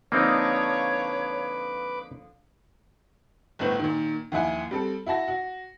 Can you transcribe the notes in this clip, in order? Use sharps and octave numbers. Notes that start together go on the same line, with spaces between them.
D3 F3 A#3 C4 D#4 B4 C#5 D6
G1 A2 B3 C5 F#7
A#2 D#3
D#2 F3 E4 F#5 G#5
G3 C4 A4
E4 F#4 A5 A#6
F#4